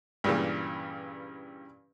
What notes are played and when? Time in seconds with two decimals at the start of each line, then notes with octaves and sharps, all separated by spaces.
0.24 G2 A#2 C#3 E3